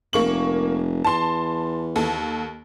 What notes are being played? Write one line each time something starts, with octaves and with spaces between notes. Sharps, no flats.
F1 A#3 C#6 F#7
E2 A5 C6
D#2 A4